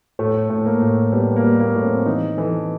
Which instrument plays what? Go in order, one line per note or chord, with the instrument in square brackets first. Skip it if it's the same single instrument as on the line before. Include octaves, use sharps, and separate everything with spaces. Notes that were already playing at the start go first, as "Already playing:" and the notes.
[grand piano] A2 A3
A2
A#3
A2
G3 B3
A#3
G3
A#3
A2
C4
E3 D#4
E3 A4